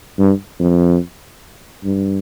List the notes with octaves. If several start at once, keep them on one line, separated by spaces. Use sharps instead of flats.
G2
F2
G2